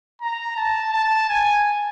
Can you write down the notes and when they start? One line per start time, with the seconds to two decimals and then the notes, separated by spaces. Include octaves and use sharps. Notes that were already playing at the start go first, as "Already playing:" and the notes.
0.22 A#5
0.57 A5
0.93 A5
1.29 G#5